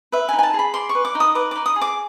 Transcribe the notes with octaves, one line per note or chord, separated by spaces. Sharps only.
B4 E5
G#5
D#4
G#5
A5
G#4
B5
D5 C6
C#6
B4
D6
D#4
D#6
B4 D6
D#4 D6
D#6
G#4
D6